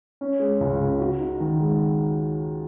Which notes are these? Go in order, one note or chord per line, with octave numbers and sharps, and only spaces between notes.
C#4
G#3
C#2
C#3
F#4
D#4
D#3
G#3